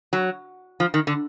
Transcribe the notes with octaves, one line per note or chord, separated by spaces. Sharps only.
F#3
F3
D#3
D3